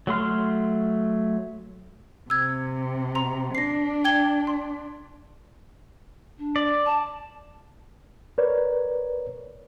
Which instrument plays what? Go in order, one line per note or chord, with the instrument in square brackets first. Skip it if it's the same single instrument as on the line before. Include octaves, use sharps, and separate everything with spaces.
[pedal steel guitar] F#3 A3 C6 F6
[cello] C3 [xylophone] E6 G#6
[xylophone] A#5 C6 F7
[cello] D4 [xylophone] A#6 C7
[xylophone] G5 G#6 G7
C6
[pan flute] D4
[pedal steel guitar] D5
[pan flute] A5
[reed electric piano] A#4 B4 C#5 D5